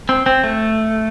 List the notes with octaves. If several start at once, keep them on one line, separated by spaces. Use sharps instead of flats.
C4
C4
A3